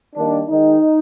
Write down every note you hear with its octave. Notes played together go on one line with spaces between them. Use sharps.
D#3 G3 A#3 D4
D#3 G#3 D#4